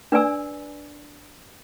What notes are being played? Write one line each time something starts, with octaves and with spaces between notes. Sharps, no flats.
D4 B4 D5 G#5 E6